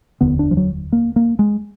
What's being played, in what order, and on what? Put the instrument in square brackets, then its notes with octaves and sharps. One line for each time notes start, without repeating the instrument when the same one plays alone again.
[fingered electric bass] F1 D#2 D3 B3
D4
F3
F#3
A#3
A#3
G#3